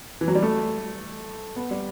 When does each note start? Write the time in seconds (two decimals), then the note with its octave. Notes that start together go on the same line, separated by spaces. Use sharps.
0.21 E3
0.28 F#3
0.35 G3
0.43 A3
1.56 B3
1.71 G3